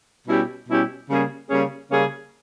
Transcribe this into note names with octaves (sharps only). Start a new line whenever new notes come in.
B2 G3 C#4 E4 G4
B2 G3 C#4 E4 G4
C#3 G3 A#3 C#4 G#4
C#3 G3 A#3 C#4 G#4
C#3 G3 A#3 C#4 G#4